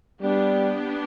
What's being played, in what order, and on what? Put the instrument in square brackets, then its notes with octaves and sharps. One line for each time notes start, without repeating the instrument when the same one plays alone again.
[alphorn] G3 [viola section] B3 D4 G4